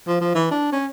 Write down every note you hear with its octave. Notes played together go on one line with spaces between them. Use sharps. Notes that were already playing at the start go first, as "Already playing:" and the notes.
F3
F3
E3
D4
C#4